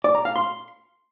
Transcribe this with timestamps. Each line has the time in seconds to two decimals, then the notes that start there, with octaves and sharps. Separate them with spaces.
0.04 D5
0.15 A#5
0.25 F5
0.36 C6